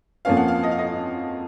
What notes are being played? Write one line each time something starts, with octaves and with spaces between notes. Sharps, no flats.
F2 F3 A#3 C#4 F5
F#5
F5
D#5
F5
D#5